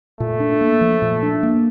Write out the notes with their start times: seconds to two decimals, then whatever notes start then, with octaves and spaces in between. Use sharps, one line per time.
0.20 A#2 A3
0.40 D4
0.61 A#3
0.81 F3
1.02 A#2
1.23 D4
1.43 A#3